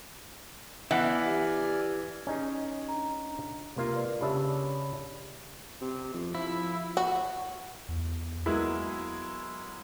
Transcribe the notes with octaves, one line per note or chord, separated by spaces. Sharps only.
E3 B3 D5 E5 F#5 G#5 F6
G4
C#4 D#4 G#4
D4 A#5
C3 A#3 F4
A#4 B4 D5
C#3 D4 G4 C#5 E5 B5
C3
F2
F3 E4
F#4
E2
F#3 G#3 A#3 B3 E4 G#4